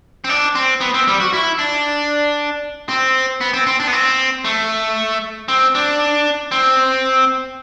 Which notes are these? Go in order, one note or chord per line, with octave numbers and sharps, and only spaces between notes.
C4
D4
C4
B3
C4
G3
F#4
E4
D4
C4
B3
C4
C4
D4
B3
C4
A3
C4
D4
C4